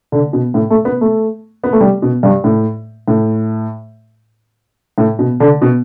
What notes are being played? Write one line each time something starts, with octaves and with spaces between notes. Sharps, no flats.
D3
B2
A2
A3
B3
A3
B3
A3
G3
B2
G2
A2
A2
A2
B2
D3
B2